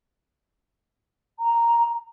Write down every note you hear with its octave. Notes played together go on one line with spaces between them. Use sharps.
A#5